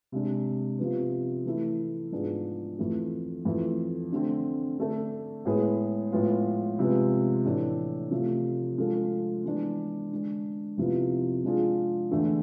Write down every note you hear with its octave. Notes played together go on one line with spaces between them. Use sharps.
C3 G#3 D4
C3 F3 B3
E3 A3 E4
G#2 F3 B3 D4 G#4
F2 E3 A3
F2 E3 A3
D3 A3 C4
D3 A3 D4 A4
A2 G#3 B3 E4 G#4
A2 F3 G#3 B3 F4
C3 F3 G#3 B3
A2 E3 A3 D4
C3 F3 A3
F3 G#3 D4 A4
E3 G#3 B3 D4
D3 G#3 D4
F2 C3 F3 B3 E4
F3 G#3 D4 F4 G#4
E2 D3 A3